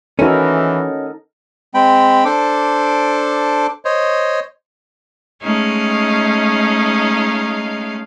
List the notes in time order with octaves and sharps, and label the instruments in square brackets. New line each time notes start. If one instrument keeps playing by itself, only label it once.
[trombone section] E3 [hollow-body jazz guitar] C#4 F#4 [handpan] D#4 A4 A#4
[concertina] G#3 C4 G5 B5
D4 A4 C5 D6
C5 C#5 D#5
[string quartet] G#3 A3 C#4 D#4 F5